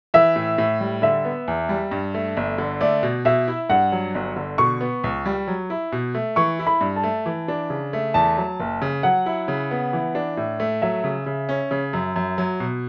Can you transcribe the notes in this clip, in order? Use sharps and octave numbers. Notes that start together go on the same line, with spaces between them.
E3 E5
A2
A2
G3
D3 E5
B3
E2
G3
G2
A3
G1
D3
A3 D5
B2
B2 E5
E4
G2 F#5
F#3
G1
D3
B2 C#6
B3
C#2
G3
F#3
E4
B2
A3
E3 C#6
E4
B5
G2
A5
A3
E3
D4
C#3
A3
E2 A5
F#3
F#1
C#3
F#3 F#5
E4
C#3
B3
E3
D4
A2
A3
F#3 E5
C#3
C#3
C#4
C#3
F#2
F#2
F#3
B2